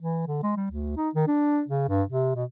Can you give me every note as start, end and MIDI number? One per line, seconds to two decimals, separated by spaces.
0.02 0.23 52
0.28 0.39 50
0.43 0.51 56
0.57 0.69 55
0.71 0.94 38
0.97 1.09 63
1.15 1.25 51
1.27 1.62 62
1.68 1.85 49
1.89 2.03 43
2.09 2.32 48
2.35 2.44 47